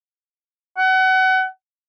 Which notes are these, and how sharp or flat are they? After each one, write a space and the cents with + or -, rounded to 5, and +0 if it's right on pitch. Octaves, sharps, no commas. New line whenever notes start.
F#5 +30